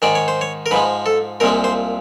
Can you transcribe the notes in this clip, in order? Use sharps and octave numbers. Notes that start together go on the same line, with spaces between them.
G#2 D#3 G#3 D5
C#5
C5
C#5
A#4
G#2 F3 G#3 B4
A4
C2 A#2 F3 G#3 A#4
C5